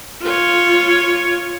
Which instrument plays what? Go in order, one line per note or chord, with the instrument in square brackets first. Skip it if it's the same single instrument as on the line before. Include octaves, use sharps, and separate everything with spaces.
[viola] F4 C#5